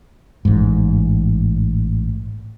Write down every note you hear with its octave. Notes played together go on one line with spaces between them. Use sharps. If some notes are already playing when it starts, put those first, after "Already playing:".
A1 G#2